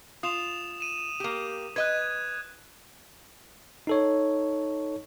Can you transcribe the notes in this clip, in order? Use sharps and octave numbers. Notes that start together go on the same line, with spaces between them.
F4 D#6 E7 F7
D#7 E7
A#3 G4
B4 D#5 F#6 G#6
D#4 A4 C#5